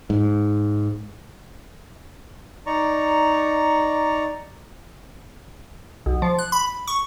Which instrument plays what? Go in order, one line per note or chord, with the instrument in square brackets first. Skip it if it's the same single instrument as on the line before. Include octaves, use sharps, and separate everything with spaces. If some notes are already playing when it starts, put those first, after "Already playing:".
[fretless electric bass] G#2
[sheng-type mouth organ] D#4 D5 A#5 C#6
[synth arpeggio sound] B1
F3
F#6
B5
C#6